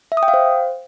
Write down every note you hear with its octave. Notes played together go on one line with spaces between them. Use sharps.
E5
D#6
G5
F5
C5